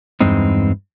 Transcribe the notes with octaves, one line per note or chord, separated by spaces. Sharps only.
E2 G2 G#3 C4 D#4